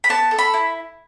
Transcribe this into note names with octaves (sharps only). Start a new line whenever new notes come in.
B5
B3 A5
A4
B5
E4